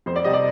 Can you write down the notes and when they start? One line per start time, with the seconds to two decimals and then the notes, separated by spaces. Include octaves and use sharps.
0.06 F2 C5
0.16 D5
0.24 C3 G3 D#5
0.33 D5